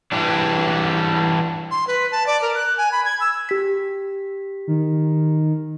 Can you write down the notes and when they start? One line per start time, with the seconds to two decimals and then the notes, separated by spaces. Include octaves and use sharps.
0.12 E3 G3 D4
1.71 C6
1.87 B4
2.11 A5
2.27 D5
2.42 A#4
2.54 F#6
2.78 G#5
2.92 B5
3.05 G#6
3.20 E6
3.49 G4 B6
4.67 D#3